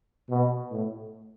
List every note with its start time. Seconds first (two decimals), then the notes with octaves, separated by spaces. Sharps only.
0.30 B2
0.71 A2